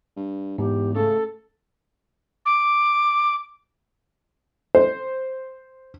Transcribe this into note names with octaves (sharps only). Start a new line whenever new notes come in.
G2
E2 G#2 G4
C#3 A3 A4
D6
C5